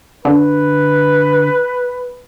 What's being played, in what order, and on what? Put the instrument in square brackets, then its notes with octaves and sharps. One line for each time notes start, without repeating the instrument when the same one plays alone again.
[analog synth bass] D3 [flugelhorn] B4